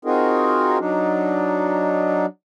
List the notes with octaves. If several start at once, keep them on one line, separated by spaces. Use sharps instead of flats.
C4 D#4 F4 F#4 G#4 A#4
F#3 D4 D#4